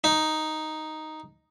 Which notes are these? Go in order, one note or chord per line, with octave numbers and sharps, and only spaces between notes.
D#4